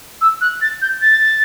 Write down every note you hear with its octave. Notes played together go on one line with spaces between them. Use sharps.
E6
F#6
A6
G6
A6